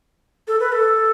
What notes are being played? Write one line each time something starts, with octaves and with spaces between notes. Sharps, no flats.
A4
B4
A4